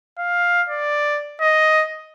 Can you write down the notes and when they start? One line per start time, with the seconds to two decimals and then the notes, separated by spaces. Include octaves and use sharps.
0.18 F5
0.69 D5
1.41 D#5